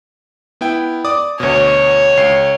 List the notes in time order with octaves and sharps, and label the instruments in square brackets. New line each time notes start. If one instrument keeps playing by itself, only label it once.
[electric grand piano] B3 E4 G5
D5 D6 D#6
[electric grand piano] D2 B2 [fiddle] C#5
[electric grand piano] C#2 C7